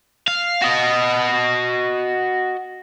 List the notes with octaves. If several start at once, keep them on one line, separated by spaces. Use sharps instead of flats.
F5
F#4 D#5